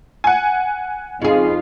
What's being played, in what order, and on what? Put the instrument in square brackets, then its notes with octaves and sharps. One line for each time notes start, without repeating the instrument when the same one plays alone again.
[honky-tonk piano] F#5 G#5
[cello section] F2 D#4 F4 [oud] C#3 G#4